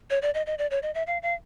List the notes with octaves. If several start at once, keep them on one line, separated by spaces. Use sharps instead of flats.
C#5
D5
D#5
D#5
D5
C#5
D#5
E5
F5
F5